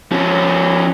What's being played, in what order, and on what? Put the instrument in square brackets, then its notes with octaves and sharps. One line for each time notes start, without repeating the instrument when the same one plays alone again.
[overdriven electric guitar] F3 C#4